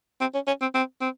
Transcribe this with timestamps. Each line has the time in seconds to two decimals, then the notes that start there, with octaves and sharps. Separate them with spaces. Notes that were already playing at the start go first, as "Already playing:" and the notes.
0.21 C4
0.34 C#4
0.47 C#4
0.62 C4
0.74 C4
1.01 C4